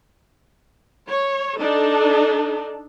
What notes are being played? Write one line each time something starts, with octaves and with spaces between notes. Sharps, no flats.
C#5
D4 D#4 A4